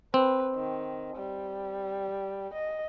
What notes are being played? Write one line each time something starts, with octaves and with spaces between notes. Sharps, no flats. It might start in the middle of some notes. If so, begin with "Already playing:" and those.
C4 B4
D#3
G3
D#5